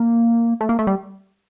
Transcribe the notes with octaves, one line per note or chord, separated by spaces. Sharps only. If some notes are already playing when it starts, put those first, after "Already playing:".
Already playing: A#3
A3
A#3
A3
G3